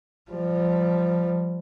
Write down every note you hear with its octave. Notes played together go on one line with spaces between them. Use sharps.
F3 G3